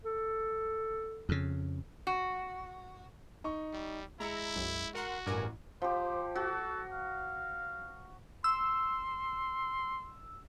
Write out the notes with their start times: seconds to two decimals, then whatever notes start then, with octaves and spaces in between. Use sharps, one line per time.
0.05 A4
1.29 F2 C#3
2.07 F#4
3.44 D#4 C#6
3.73 G3
4.20 G#3 E4 A#5 E6 C#7
4.56 B1 F#2
4.95 F#4 A#4 F#5 C6
5.26 A1 G2 A#4 G#5 D6
5.82 F3 G4 C5
6.36 F#4 A4
6.92 F5
8.44 C6 E6